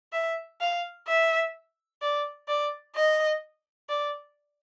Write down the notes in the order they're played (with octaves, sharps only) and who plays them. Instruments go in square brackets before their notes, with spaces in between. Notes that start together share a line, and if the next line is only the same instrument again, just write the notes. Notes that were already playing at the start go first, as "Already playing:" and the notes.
[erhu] E5
F5
E5
D5
D5
D#5
D5